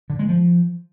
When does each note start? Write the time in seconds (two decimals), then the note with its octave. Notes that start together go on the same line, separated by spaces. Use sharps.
0.10 D3
0.19 G#3
0.29 F3